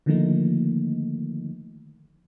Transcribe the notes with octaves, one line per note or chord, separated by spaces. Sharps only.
D3 D#3 F3 A3 A#3 D#4